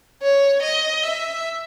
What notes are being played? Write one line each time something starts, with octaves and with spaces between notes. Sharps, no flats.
C#5
D#5
E5